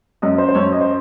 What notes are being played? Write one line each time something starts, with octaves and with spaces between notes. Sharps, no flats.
F#2 D#5
C5
C5
F#2 C#5
D#5
C5